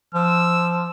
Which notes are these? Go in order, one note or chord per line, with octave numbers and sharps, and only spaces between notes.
F3 E6